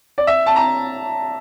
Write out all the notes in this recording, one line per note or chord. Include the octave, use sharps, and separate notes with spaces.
D5
E5
A5
A#5